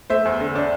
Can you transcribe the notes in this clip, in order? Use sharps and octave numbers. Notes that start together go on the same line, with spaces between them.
A3 C5 E5
E2
D3
D4